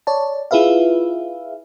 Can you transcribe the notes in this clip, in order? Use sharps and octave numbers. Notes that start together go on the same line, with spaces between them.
C#5 D5 A5
E4 F4 G#4 B4 E5 F5